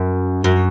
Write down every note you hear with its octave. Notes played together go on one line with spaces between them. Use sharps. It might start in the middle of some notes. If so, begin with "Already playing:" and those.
Already playing: F#2
F#2